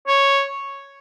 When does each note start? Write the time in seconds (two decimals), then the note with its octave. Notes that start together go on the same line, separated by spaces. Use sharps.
0.08 C#5